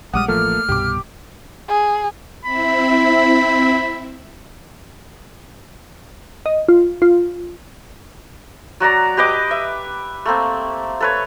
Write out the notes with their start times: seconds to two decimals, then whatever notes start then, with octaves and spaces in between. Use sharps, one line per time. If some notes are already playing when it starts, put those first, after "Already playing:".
0.14 A#1 G3 G#3 F#5 D6 D#6 F6
0.28 A1 F3 A3 A#3 A4 F6
0.69 C2 G2 B2 G4 D6
1.68 G#4
2.45 C4 E4 E5 B5
6.46 D#5
6.68 F4
7.02 F4
8.80 F#3 F#4 D5 A#5
9.17 G4 B4 D#5 D6
9.51 E5
10.26 A3 A#3 C4
11.01 A4 B4 C#5